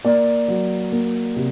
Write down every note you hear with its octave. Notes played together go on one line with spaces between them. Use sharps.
A#3 D5
F#3
A#3
C3